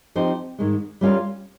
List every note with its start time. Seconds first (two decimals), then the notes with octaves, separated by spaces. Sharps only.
0.16 F3 C4 D#4 G4 C5
0.58 G#2 D#3 G#3
1.01 G3 C#4 F4 A#4 F5